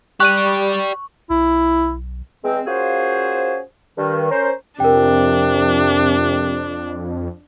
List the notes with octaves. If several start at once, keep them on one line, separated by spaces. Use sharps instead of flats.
G3 G4 D5 C#6 F#6 D#7
B1 E4
E2 G#3 C4
A#3 C#4 F4 F#4 G#4 C5
G2 D#3
C#4 A#4 C5
F2 C3 D4 A#4 G5